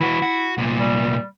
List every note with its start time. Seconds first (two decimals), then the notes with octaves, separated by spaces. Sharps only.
0.01 E3 E4 F#4
0.22 F#4
0.58 C2 A#2
0.79 G3